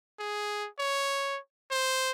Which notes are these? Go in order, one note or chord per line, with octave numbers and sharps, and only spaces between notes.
G#4
C#5
C5